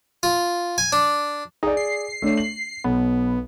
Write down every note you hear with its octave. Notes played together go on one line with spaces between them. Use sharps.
F4
G#5
D4
D#4 G#4 D5
C7
A3 D4 C#5
F#7
B1 B3